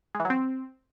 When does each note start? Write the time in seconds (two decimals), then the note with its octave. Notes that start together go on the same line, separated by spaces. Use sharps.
0.15 G#3
0.20 E3
0.25 F#3
0.30 C4